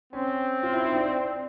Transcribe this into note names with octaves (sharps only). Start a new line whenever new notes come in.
C4 C#4
F4
E4
D#4
D4